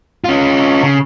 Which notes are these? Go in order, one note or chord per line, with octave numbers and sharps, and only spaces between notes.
C#4 F4
C#3